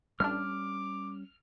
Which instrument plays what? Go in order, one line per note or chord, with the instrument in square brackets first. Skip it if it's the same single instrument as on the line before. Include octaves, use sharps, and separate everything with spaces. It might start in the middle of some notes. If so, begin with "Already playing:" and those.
[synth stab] A1 D4 [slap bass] G3 C#4 [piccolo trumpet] D6 [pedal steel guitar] F6